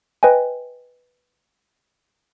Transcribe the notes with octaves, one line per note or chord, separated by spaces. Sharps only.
B4 D#5 G5 G#5